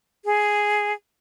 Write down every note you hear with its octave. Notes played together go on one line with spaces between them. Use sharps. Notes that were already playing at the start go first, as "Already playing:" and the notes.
G#4